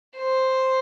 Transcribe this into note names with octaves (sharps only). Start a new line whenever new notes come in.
C5